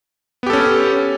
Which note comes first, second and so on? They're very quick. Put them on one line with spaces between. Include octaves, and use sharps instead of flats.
B3 G4 A4 C#4